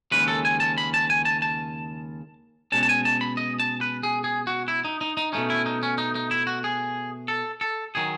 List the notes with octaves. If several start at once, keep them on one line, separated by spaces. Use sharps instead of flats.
D#2 C#3 G#3 C#4 B4
A4
G#5
A5
B5
A5
G#5
A5
A5
B2 G#3 C#4 A5
A5
G#5
A5
B5
D#5
A5
B4
G#4
G#4
F#4
E4
D#4
D#4
D#4
B2 A3 C#4 D#4
E4
D#4
C#4
D#4
D#4
E4
F#4
G#4
A4
A4
D#3 F#3 G#4